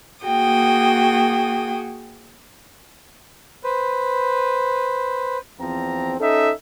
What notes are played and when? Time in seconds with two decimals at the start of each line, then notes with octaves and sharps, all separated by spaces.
0.25 A#3 F#4 G#4 G5 D#6
3.64 B4 C5
5.60 E2 F3 C4 A#5
6.20 C#4 D#4 A4 E5